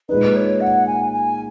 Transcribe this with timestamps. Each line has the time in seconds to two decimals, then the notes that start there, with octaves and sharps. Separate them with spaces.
0.09 A#2 G#3 D#4 B4
0.36 C#5
0.61 F#5
0.87 G#5
1.12 G#5